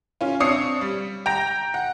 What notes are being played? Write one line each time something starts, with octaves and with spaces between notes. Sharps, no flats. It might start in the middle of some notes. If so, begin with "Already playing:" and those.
C#4 F4
C4 D4 C#5 D#6 C7 C#7
G3
G5 A#5 A#6
F#5